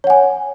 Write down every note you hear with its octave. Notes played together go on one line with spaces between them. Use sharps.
C#5 F#5 G#5